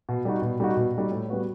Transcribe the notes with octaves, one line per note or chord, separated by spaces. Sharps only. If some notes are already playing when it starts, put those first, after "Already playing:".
B2
G3 D#4 F#4
B2
G3 D#4 F#4
B2
G3 D#4 F#4
A2
G3 B3 F#4 B4